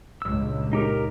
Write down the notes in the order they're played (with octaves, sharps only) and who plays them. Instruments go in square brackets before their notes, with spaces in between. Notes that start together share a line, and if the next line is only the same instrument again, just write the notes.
[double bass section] C#2 G2 A#2 [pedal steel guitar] E6
[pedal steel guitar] D#4 G4 A#4